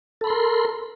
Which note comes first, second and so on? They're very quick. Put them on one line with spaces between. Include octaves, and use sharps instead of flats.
A4 B5 C6 A#4